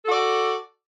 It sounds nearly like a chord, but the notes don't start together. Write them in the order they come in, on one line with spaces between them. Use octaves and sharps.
A4 F#4 D5